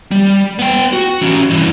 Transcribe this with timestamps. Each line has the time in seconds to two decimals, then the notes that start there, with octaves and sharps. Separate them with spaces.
0.11 G3
0.59 B3 G5
0.93 F#4
1.21 E3 C#4
1.50 G2 E3